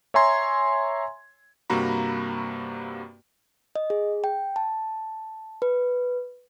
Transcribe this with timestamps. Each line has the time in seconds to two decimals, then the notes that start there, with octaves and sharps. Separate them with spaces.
0.14 C#5 E5 G#5 A#5 C6 G#6
1.70 G2 C3 A#3 F#4 A#5 B5
3.76 D#5
3.90 G#4
4.24 G5
4.56 A5
5.62 B4